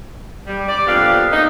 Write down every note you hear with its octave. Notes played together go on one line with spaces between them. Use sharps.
G3
D5
F2 A#2 B3 D4 G4 F5
A#3 D#4